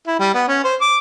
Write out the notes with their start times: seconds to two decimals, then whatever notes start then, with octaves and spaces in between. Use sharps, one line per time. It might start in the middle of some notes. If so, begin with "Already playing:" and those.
0.07 E4
0.20 G3
0.34 B3
0.48 C#4
0.64 C5
0.81 D6